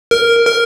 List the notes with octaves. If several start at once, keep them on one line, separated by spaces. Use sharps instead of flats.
A#4
A#4